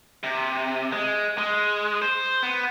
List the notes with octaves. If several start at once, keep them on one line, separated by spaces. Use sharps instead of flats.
C3
G#3
G#3
C5
B3